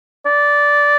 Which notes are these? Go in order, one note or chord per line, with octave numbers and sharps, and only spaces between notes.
D5